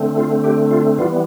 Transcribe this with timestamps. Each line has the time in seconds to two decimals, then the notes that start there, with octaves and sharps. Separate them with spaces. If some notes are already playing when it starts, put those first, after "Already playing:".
Already playing: D3 A3 C4
0.17 F4
0.44 G4
0.71 F4
0.98 E3 G3 B3 F4